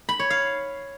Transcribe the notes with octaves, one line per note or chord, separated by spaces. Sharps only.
B5
C#5
F5